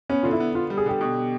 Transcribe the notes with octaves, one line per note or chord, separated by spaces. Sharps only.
B3 C#4
D3 F4
E4
B3
B3 F4
G3
G#4
D3 G4
B2